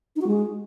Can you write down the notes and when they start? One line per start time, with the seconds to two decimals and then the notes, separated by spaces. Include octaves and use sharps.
0.16 D#4
0.21 F#4
0.27 G#3